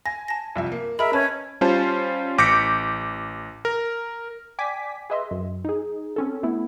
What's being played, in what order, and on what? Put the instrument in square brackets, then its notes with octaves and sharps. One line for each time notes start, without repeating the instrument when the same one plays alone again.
[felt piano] G#5 [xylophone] A#6
[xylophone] A5 A#6
[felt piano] C2 F2 E5
A#3
[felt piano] G#4 A#4 A#5 [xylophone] D#5 B5 [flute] E5
[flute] C#4 [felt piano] B4 [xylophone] A5
[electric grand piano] G3 C#4 F4 C5 A5
A1 D6 G6 A#6 B6 C#7
A#4
[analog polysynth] D5 G5 G#5 D6 B6
G#4 B4 D#5 E5 C6
F#2
D#4 G#4
C4 C#4 A4
A3 B3 E4